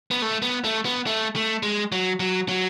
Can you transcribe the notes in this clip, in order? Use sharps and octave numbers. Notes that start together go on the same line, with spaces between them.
B3
A3
B3
A3
B3
A3
A3
G#3
F#3
F#3
F#3